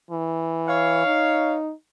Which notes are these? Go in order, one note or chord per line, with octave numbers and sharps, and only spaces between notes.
E3
C#5 F5
D#4